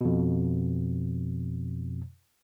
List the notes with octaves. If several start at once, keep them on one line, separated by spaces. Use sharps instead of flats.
F2 B2